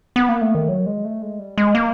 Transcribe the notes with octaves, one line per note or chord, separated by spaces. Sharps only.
B3
A#3
A3
D#3
F#3
G#3
A3
G#3
G3
G#3
A#3